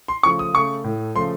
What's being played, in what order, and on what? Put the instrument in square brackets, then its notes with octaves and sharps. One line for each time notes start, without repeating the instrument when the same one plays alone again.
[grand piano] C6
C#3 F3 A3 C#6
D#6
C#3 A3 C#6
A2 A3
C#3 F3 A3 C6